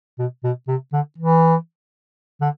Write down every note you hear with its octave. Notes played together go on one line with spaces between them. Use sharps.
B2
B2
C3
D3
E3
D3